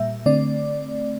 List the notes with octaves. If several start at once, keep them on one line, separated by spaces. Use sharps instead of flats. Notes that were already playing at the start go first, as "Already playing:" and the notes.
Already playing: A#2 G3 A#3 E5
D3 A3 C4 D5